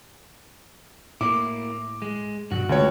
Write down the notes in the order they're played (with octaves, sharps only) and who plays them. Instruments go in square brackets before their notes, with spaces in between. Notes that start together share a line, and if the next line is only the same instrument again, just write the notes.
[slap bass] A2 [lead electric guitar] A#3 E4 [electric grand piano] D6
[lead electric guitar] G#3
[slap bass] G2 B2 G3 [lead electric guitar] F#4
[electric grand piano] C#2 C#5 [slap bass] D3 A3